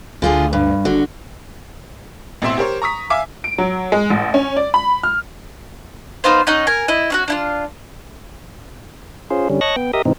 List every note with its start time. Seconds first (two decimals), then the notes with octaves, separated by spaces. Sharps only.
0.22 D2 D3 F4 G#4
0.53 G2
0.85 F#1 D3 F#4
2.42 A1 B2 C4 E5 C6 E7
2.58 G4 A#4 C5 C#5
2.82 A#5 C#6 D#6 B6
3.10 E5 F5 G#5 D6
3.44 D7
3.58 F#3
3.92 G#3
4.10 A1
4.34 C#4
4.57 D5
4.74 B5
5.03 F6
6.24 B3 D#4 F4 C5
6.47 C#4 D#4 F#5
6.67 A#4 G#5
6.88 E4 D#5
7.10 C#4 D4 F#4
7.28 D4 E4 F4
9.30 C#4 F4 G#4 C5
9.50 D3 G3 C#4
9.61 C#5 D#5 A5 C#6 F#6 A#6
9.76 B3 G5
9.93 G4 A#4 D#5 E5 D#6
10.05 G#2 C3 E3 C4 D#4